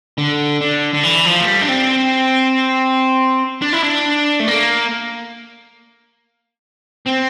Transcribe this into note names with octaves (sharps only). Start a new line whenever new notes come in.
D3
D3
D3
E3
F3
A3
G3
D4
C4
D4
E4
D4
A3
A#3
C4